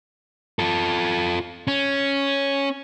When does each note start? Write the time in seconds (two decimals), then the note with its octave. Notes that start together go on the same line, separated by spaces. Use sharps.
0.59 F4 A4
1.68 C#4